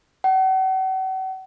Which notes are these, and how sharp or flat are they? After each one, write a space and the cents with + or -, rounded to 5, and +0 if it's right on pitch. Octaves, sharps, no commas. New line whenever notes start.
F#5 +40